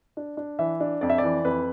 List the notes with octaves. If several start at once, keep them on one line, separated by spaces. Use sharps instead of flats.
D4
D4
E3 E5
D4
F2 D5
E5
D5
E3
F2 B4